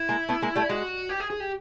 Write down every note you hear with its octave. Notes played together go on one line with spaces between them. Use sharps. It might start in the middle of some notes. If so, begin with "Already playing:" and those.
Already playing: E4
G#3 A#3
A3 B3
G#3 A#3
G3 A3
G#3 F#4
G4
G#4
G#4
G4